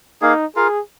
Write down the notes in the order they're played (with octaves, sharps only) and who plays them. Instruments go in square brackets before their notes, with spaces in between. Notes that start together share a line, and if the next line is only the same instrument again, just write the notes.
[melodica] A#3 G#4 F5 [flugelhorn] D#4
[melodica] F4 A#4 F5 [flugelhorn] G#4